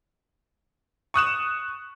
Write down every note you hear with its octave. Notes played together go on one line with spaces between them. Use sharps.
C#6 D#6 F#6 E7